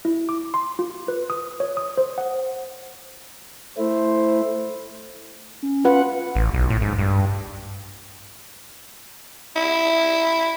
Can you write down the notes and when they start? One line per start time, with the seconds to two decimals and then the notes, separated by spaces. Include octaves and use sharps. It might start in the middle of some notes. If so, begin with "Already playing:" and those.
0.05 E4
0.29 D6
0.54 C6
0.79 F4
1.08 B4
1.30 D#6
1.60 C#5
1.77 D#6
1.97 C5
2.18 F#5
3.78 A3 E4 C5
5.63 C#4
5.85 F4 B4 F#5
6.35 A1
6.54 B1
6.70 A2
6.82 G#2
6.99 G2
9.56 E4